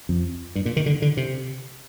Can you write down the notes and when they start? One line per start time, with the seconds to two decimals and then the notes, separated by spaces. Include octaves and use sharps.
0.09 F2
0.56 G2
0.66 A#2
0.76 D#3
0.86 D3
1.02 D3
1.17 C3